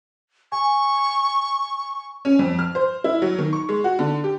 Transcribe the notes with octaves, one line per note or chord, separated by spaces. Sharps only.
G#5 C#6
C#4
F2
F6
C5
E4
F#3
D#3
C#6
G#3
F#4
D3
G4